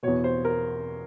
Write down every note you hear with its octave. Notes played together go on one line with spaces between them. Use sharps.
E2 B2 C#5
C5
A#4